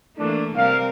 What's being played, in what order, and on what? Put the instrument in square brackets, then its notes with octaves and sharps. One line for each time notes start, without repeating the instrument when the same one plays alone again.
[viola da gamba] E3 A3 A#3 [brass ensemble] D4
[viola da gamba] C3 G3 A#4 [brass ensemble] F5